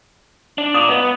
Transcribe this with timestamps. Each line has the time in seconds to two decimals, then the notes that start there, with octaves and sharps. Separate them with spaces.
0.58 D4
0.74 F4 D5 D#6
0.89 B3 D#5